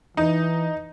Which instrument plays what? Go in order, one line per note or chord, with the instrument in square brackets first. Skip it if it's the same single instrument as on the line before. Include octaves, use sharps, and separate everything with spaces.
[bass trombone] E3 [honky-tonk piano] D#4